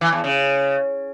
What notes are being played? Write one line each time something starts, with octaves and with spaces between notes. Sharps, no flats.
E3
E2
C#3